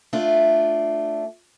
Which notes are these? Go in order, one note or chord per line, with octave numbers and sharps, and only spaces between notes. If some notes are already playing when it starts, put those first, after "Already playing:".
A3 D4 F4